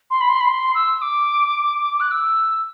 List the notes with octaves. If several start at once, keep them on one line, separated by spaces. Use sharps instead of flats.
C6
B5
C6
B5
C6
E6
D6
F#6
E6